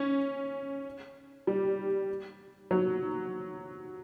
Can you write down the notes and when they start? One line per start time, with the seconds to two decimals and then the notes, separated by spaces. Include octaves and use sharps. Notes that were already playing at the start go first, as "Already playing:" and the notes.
Already playing: C#4
1.47 G3
2.71 F#3